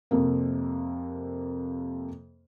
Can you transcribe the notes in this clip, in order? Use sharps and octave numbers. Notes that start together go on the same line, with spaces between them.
F2 C3 A#3